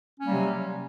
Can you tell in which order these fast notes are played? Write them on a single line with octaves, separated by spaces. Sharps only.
C#4 A#3 G3 F#3 C3